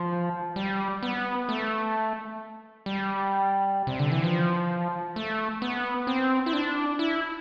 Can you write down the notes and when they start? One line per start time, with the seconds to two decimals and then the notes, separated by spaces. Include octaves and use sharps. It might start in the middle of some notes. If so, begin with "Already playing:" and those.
Already playing: F3
0.56 G3
1.03 B3
1.49 A3
2.86 G3
3.87 C3
3.99 D3
4.12 E3
4.24 F3
5.16 A3
5.62 B3
6.07 C4
6.46 E4
6.53 D4
6.99 E4